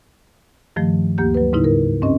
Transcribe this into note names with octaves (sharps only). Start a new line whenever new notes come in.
G2 D#3 F3 A3
D2 A#3 G4 G6
F#3 B4
G#2 C#3 D#4 E4
A#4
G2 C4 C#4 D#5